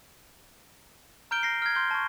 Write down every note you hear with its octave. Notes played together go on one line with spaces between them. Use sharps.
A#5 F6 G6 D7 G7
A#6 C7
F6 G#6
C6 G6 G7
A5 C#6